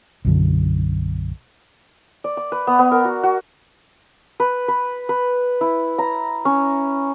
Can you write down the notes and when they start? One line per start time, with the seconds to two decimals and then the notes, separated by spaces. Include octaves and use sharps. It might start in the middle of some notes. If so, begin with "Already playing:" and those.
0.25 B1 F#2 D3
2.24 D5
2.37 D6
2.52 B4
2.67 B3
2.79 B3
2.92 A#4
3.05 F#4
3.23 F#4
4.40 B4
4.68 B4
5.09 B4
5.61 E4
5.98 A#5
6.45 C#4